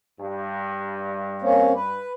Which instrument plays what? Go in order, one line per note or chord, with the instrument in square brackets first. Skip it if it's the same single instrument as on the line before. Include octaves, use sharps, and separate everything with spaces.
[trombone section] G2
[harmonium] A#3 C4 C#4
B4